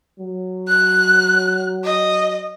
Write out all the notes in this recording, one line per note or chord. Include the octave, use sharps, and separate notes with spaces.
F#3
F#6
D#5